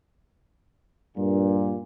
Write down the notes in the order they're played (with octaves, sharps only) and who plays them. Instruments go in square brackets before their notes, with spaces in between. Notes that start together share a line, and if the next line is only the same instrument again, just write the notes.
[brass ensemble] G2 A#2